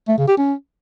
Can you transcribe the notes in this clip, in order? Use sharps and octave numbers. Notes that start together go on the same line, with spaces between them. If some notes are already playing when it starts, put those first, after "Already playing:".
A3
C#3
G4
C#4